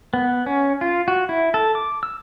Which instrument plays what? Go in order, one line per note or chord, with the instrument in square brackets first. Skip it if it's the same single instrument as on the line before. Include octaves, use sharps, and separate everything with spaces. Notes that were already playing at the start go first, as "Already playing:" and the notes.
[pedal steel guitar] B3
C#4
F4
F#4
E4
A4
D6
E6